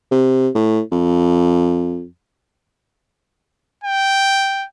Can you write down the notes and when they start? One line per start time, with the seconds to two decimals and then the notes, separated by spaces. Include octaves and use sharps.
0.11 C3
0.55 A2
0.92 F2
3.84 G5